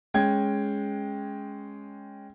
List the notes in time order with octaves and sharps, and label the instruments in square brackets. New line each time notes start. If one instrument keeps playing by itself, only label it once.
[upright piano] G#3 C#4 G5 G#6